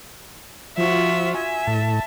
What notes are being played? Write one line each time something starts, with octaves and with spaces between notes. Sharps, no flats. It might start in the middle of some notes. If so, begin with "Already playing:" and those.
F3 F4 F#4 E5
E5 G#5
A2 A5